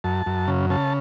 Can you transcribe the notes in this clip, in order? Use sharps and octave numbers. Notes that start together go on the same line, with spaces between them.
F#2 A5
F#2
C#3
C#3 A5